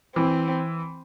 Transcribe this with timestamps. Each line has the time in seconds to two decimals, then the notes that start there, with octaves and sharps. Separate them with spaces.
0.16 E3 C4